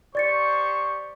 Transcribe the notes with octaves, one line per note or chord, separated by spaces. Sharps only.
G4 C5 D5 C#6 A6 C#7